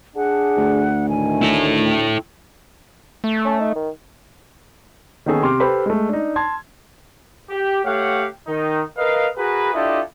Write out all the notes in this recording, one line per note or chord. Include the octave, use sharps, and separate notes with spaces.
D4 G#4 F#5
D2
A2 D#3 G#5
E4 A4
G5
A3
C#4
D#4
D#3
D#3 A#3 B3 C#4 G#4 A4
C3 G4 C6 D6 F6
G4 A4 B4 C5 B5
G#3 A3
D4 D#4
A5 C6 G#6
G4
A3 G4 C#5 F5 F#5
D#3 D#4
A#4 B4 D#5 F5
F#4 G#4 A#4 B4
D4 E4 F4 G4 A4 D#5